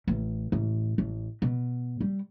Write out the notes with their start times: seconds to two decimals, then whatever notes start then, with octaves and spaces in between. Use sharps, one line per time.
0.07 A1
0.52 A1
0.98 A1
1.42 B2
2.00 G3